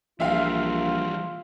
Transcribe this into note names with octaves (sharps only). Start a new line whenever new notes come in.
A#1 E3 G3 F4 E5 F5